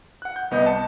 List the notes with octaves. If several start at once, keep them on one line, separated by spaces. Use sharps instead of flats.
F#5 F#6
G6
C2 B3 D#5 G6
A5 C#7